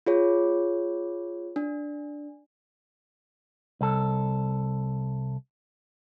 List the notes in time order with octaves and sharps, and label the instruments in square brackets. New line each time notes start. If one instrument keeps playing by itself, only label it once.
[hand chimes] F4 G#4 C#5
D4
[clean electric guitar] C2 A4